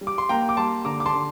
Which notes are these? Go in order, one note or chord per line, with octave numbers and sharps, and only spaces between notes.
G3
D6
C6
A#3 G5 A#5
D6
G3 A5 C6
D3 A#5 D6
D6
A5 C6
D3